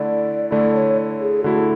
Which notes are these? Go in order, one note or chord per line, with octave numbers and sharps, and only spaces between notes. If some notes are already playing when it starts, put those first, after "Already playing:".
Already playing: D3 A3 E4 D5
D3 A3 E4 D5
C#5
G#4
D3 A3 E4 F#4